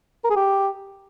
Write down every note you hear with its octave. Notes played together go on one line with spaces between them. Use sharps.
A#4
G#4
G4